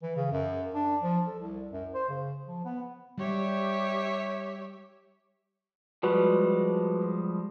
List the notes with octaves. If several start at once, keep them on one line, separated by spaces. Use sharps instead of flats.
E3
C#3
F#2
D4
F3
A4
C2
F#2
C5
C#3
F3
B3
G3 G4 C#5 E5
F3 G3 G#3 F#4 B4